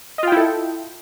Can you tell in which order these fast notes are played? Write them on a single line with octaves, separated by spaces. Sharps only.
D#5 F4 G5 E4 A4